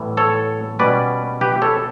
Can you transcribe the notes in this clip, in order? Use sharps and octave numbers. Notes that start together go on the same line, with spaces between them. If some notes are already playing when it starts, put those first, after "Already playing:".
Already playing: A2 E3 G3 B3
A4 C#5
B2 G3 C#4 B4 D5
G4 B4
A4 C#5